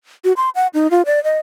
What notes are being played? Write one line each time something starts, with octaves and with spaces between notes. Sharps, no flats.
F#4
C6
F#5
D#4
F4
D5
D#5